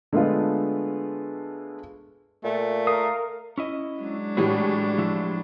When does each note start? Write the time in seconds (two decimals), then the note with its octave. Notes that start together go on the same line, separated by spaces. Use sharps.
0.12 D3 G#3 A3 B3 F4
2.44 A#2 A3
2.87 A#4 F5 D#6
3.58 C#4 E4 D#5
4.00 F#3 G#3 D4
4.37 A2 E3 G3 F#4 G#4
4.98 F3 E4